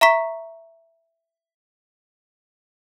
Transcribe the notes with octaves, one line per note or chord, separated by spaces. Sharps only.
E5 A#5 C#6 B6